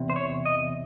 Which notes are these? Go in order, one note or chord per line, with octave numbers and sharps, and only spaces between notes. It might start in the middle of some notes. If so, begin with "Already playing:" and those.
Already playing: E2 C3
C5
C#5
D#5